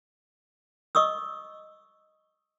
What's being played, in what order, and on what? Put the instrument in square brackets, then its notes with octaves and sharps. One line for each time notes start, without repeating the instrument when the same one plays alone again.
[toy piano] D#5 C#6 D#6 E6